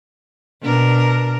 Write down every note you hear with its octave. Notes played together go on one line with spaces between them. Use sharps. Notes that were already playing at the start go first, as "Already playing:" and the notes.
B2 D4 A#4